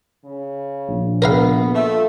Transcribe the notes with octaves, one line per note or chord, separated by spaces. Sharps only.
C#3
A#1
B3 A#4 B4 F5
A3 F4